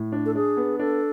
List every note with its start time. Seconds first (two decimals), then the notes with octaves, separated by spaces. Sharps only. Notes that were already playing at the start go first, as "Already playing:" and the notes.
Already playing: A2
0.12 D4
0.26 A4
0.35 D4 G#4
0.57 B3
0.79 D4 A4